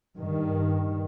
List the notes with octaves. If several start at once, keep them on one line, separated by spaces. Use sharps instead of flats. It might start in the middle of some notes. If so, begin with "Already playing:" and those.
G2 D#3